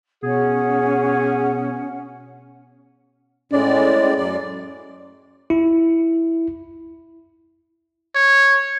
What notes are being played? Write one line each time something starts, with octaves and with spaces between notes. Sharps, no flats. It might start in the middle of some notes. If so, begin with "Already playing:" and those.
B2 C#4 G#4 F#5
A2 G#3 C#4 D5
F#2 D5
E4
C#5